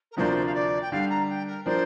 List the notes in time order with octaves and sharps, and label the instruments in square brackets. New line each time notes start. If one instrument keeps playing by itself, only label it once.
[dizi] A#4
[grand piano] D2 C3 F3 A#3 D4 [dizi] C5
[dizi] F5
D5
G5
[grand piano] D3 G3 D4 G4 [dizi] F5
[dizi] A#5
G5
A#4
[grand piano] F3 D4 A#4 [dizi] C5